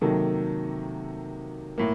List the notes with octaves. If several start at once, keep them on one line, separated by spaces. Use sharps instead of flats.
C3 D#3 F#3 A#3 A4
A2 A#3